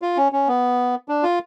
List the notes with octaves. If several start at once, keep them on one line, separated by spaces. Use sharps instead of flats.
F4
C#4
C#4
B3
D4
F4